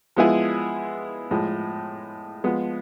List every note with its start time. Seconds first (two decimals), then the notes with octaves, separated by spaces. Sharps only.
0.16 F3 G#3 B3 E4 G#4
1.31 A2 F3 G#3
2.44 F3 G#3 B3